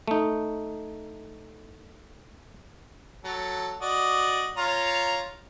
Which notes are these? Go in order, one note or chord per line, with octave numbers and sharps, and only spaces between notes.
A3 D#4
F#3 A4
F#4 D5 D#5
F4 C#5 A#5